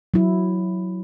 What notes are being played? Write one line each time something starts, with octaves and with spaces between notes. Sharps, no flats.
F#3 E4